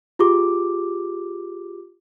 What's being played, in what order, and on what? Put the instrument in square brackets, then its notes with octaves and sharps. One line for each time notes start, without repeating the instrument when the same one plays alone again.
[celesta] F4 G4 G#4 D6